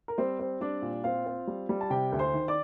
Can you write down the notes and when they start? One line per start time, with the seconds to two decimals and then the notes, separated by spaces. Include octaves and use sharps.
0.08 A#4
0.18 G3 C4 C5
0.39 C4
0.61 G3 D4 D5
0.82 A#2
1.04 C4 F4 F5
1.26 C4
1.47 G3
1.69 G3
1.81 A5
1.90 C3 G4 G5
2.12 D2
2.19 C5 C6
2.34 D#3
2.48 D5 D6